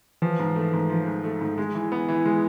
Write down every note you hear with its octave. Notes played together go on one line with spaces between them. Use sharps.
E3 F3
G#2
A3
G#2
F3
G#2
A3
G#2
G#3
E3
B3
E3
G#3